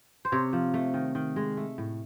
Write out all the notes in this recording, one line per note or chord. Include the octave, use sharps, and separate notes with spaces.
C5
C3 C#5
F3
A3
D#3
D#3
G#3
A3
A2